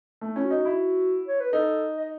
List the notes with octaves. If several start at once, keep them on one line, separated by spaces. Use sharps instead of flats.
A3
C#4 E4
F#4
D#4
E4
C#5
B4
D#4 A4
D#5